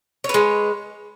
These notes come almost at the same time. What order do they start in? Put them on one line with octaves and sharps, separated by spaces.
C#5 B4 G#3